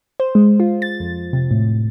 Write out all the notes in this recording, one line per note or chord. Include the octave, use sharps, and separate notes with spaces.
C5
G#3
F4
A6
F2
C3
A2